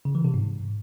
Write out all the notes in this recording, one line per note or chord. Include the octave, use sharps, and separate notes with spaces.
C#3
E3
C3
G#2